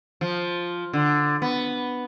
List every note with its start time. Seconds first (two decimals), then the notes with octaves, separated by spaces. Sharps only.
0.21 F3
0.93 D3
1.42 B3